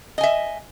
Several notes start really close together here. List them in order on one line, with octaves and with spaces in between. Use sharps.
D#5 G#5 E5